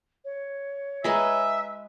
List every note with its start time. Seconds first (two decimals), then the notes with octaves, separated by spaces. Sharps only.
0.25 C#5
1.04 G#3 B4 D#5 E5 G#5 A#5